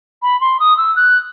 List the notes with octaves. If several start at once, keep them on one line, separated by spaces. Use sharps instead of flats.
B5
C6
D#6
E6
F#6